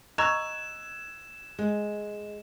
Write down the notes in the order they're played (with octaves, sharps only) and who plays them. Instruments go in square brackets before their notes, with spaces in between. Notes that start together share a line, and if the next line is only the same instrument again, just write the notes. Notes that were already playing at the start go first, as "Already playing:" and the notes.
[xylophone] D#5 A#5 C#6 [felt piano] E6 F#6 G#6 [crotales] E7
[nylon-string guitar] G#3